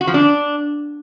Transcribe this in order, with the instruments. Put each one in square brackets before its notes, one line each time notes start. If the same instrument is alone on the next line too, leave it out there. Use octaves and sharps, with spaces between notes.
[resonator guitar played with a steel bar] F#4
F3
D4